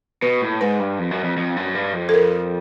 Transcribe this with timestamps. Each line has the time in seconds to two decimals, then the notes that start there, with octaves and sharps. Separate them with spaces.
0.22 B2 B4
0.42 A2
0.61 G#2 B4
0.79 G2
0.99 F2
1.11 F#2
1.24 F2
1.37 F2
1.56 F#2
1.75 G2
1.94 F2
2.09 A4
2.14 A#4